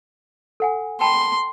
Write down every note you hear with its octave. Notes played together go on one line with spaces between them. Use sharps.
A4 F#5 G#5
G5 A5 B5 C6